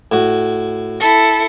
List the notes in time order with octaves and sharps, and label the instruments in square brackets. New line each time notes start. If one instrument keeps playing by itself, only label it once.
[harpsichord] A2 F#4
[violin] E4 A4